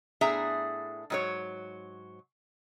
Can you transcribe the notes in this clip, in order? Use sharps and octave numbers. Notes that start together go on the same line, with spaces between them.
A2 B3 D4 G#4 E5 A#5
G#2 F#3 C#5